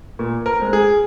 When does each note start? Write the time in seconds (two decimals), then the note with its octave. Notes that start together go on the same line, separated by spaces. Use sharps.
0.19 A#2
0.46 A#4
0.59 G#3 C4
0.73 G#4